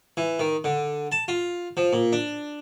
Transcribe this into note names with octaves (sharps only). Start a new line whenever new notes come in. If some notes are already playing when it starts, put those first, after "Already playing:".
E3
D#3
D3
A5
F4
F3
A#2
D4